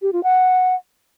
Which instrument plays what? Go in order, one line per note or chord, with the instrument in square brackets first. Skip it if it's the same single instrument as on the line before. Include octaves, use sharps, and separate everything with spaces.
[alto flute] G4
F4
F#5